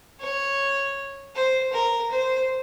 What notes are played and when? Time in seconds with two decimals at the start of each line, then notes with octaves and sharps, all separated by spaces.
0.20 C#5
1.35 C5
1.73 A#4
2.11 C5